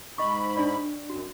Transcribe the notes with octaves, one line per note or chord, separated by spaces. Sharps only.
G#2 D#5 B5 C#6
D4 D5
F#2 F#4